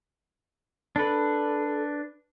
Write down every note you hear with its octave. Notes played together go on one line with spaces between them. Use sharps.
D4 A4 B4